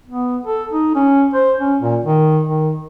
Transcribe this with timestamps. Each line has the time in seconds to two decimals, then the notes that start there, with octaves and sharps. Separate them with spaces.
0.08 B3
0.45 A4
0.72 D#4
0.95 C#4
1.33 C5
1.60 C#4
1.81 A#2
2.04 D#3
2.47 D#3